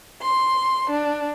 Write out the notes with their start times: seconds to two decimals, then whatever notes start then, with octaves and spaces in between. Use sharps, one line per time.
0.22 C6
0.91 D4